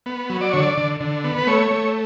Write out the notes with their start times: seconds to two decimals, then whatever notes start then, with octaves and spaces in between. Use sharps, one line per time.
0.06 B3
0.30 F#3
0.41 D5
0.53 D3 C#5
0.63 D5
0.77 D3
1.00 D3
1.24 B3
1.38 B4
1.47 A3 C#5
1.71 A3